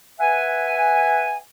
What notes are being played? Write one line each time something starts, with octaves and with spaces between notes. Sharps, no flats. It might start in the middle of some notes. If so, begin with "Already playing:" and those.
B4 E5 F#5 G#5